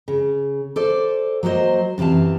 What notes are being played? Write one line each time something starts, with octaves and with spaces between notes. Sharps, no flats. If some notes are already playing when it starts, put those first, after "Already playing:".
C#3
A4 C5 D5
F#3 A#3 F#4 C5 D#5
F#2 C3 E3 F5 A5